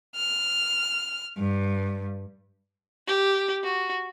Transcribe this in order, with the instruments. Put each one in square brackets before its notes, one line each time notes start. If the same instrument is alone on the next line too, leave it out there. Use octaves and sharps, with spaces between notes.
[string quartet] F6
G2
[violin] G4
F#4